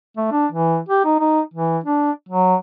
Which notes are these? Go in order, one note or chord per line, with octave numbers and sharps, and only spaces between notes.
A3
D4
E3
G4
D#4
D#4
E3
D4
F#3